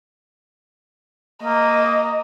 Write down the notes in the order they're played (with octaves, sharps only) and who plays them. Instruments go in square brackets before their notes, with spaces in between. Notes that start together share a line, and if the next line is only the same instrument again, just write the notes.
[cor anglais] A#3 [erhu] D#5